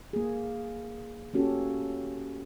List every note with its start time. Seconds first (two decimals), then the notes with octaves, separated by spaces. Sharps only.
0.13 A#3 G#4
1.34 A#3 C#4 F#4 G4 A4